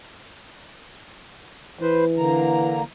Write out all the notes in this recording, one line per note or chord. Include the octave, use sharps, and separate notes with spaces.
E3 B4 C5
D3 A#3 A#5